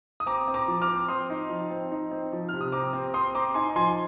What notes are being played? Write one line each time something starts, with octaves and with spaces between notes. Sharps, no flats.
D#6
C4 A#5 D6
C4
A#5 D6
F3
D6 F6
C4
C4 C6 D#6
D#4
F3
C4
D#4
C4
F3
C3 F6
D#6
C4 A#5 D6
C4
C4 C6 D#6
C4 A#5 D6
D#4 G#5 C6
F3 G#5 C6